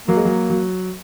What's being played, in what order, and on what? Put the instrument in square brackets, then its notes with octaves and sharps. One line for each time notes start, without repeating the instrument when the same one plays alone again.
[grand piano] F#3 [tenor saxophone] A#3
[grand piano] G#3
F#3
F#3